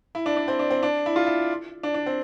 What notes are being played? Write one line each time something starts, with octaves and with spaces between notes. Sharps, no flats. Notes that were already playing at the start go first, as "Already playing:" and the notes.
E4
D4
D4
C4
D4
C4
D4
E4
F4
E4
D4
D4
C4